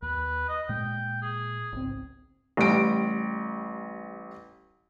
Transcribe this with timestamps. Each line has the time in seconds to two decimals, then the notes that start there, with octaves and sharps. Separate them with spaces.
0.02 D#2 B4
0.48 D#5
0.69 A#2 G#3 G5
1.22 G#4
1.73 G#1 C#2 C4
2.57 A1 G3 D7